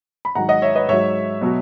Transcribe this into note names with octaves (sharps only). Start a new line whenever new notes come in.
B5
G#2 D#3 F#3 F#5 A#5
D#5 F#5
C#5 E5
B4 D#5
G#2 F#3 C#5 E5
B2 F#3